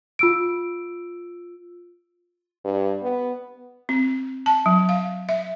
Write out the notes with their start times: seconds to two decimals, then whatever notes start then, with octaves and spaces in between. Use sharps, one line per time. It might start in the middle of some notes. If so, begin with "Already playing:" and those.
0.19 F4 E6 D7
2.65 G2
3.03 B3
3.89 C4
4.46 A5
4.66 F#3
4.89 F5
5.29 E5